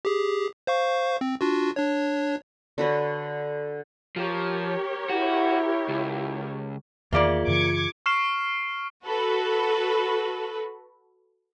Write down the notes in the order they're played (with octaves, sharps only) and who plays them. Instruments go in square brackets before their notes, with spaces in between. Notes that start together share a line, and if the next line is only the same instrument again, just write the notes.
[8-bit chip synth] G4 G#4
C5 F5 C#6
C4
D4 F4 F#4
D4 C#5
[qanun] D3 F#4 B4 C#5
[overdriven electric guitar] F3 [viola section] G4 A#4 C#5
[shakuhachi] E4 [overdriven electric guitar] F#4
[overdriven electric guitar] C#2
[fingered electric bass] E2 D#3 [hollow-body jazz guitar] A#3 D5 [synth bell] F4 G#4 E5
[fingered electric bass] F#2 C#3 E3 [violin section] D6 G#6 C#7
[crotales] C#6 F6 C7 E7
[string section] F#4 A4 B4